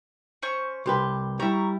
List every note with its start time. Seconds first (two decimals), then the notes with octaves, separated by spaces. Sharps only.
0.42 C#4 C5 C#6
0.86 C2 G4 B4 C6
1.39 G3 E4 A#5 C#6